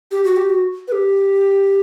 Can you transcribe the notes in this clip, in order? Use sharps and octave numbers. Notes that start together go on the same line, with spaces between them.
G4
F#4
G4
F#4
B4
G4